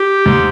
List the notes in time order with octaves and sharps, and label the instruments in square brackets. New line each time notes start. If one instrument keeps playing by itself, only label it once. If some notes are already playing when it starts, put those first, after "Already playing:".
Already playing: [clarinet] G4
[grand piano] G#2